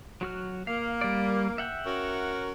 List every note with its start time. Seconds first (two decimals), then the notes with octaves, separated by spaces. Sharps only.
0.21 F#3 F#4 F6
0.67 A#3 F5
1.01 G3 D5
1.58 E5 F#5 G5
1.85 C#4 F#4 A#4